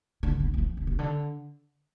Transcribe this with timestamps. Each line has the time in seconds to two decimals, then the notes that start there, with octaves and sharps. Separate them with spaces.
0.23 D3
0.40 B2
0.54 E3
0.58 F3
0.77 D3
0.87 C3
0.99 D3